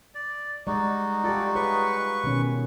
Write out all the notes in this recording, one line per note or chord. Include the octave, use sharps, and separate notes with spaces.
D5
G3 G#3 D#4 F#4 D5
F4 G4 A4 D5
F4 G#4 B4 C#5 C#6
B2 D#3 C#4